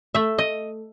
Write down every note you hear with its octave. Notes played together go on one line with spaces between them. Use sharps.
A3 E5
D#5